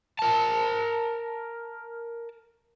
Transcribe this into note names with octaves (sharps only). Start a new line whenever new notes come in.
A#4 A5